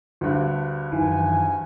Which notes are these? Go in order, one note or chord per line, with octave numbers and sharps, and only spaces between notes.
D2 G2
F#2 D#3 E3 G#5